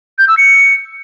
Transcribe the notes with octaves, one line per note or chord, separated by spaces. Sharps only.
G6
E6
C#7